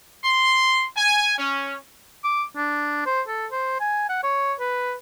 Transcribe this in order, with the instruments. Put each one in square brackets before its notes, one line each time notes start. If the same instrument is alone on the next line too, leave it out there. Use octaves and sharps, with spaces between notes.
[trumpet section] C6
G#5
C#4
[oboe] D6
D4
C5
A4
C5
G#5
F#5
C#5
B4